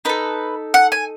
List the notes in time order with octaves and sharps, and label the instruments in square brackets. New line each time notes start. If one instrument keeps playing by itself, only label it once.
[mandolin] D#4 A4 B4
F#5
G#5